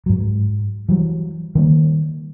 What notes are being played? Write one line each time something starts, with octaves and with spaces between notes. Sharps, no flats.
G#2 F#3
E3 F#3 G3
D#3 G3 A#3